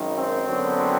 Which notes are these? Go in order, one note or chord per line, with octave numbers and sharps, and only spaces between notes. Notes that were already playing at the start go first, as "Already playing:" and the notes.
Already playing: G#1 F#2 D#3
C4
G#1 F#2 D3 F#3 B3